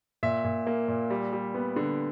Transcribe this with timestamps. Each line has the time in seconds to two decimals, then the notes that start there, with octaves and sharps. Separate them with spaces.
0.23 A#2 E5
0.45 A#2
0.67 A#3
0.88 A#2
1.10 G3
1.33 G3
1.55 B3
1.76 D3